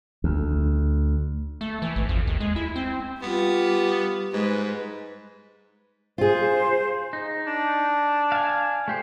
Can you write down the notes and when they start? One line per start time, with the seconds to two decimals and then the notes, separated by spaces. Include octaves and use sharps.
0.24 D2
1.61 A3
1.82 E3
1.96 G#1
2.09 F2
2.27 D#2
2.40 G#3
2.56 E4
2.76 C4
3.22 G3 B3 F4 G4
4.33 G#2 G#3 B4
6.18 F4 G#4 C5
7.13 D#4
7.47 D4
8.32 F5 G#5
8.88 A3 G4 C5